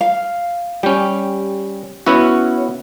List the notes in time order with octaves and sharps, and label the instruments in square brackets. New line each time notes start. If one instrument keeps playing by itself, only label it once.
[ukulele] F5
[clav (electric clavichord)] G3 C#4 [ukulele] G4
[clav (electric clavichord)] B3 E4 F#4 [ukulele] C#4